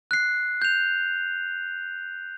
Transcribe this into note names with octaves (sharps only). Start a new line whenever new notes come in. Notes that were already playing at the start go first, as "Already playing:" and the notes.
F#6 C7
G6 F7